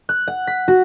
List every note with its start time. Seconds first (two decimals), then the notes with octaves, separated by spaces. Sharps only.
0.09 F#6
0.28 F#5
0.47 B6
0.68 F#4